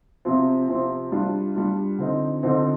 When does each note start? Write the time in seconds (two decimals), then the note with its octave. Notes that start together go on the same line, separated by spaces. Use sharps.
0.25 C3 F3 C4 F4
0.68 C3 F3 C4 F4
1.12 G3 D4 F4
1.55 G3 D4 F4
1.99 D3 F3 C4 D#4
2.43 D3 F3 C4 D#4